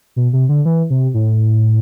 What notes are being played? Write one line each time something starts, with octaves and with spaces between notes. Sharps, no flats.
B2
C3
D3
E3
C3
A2